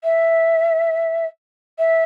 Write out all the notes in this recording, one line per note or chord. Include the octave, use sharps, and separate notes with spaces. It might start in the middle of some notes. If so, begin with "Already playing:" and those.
E5
E5